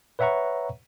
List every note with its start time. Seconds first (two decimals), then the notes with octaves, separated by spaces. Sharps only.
0.19 B4 C#5 E5 F#5 A#5 C#6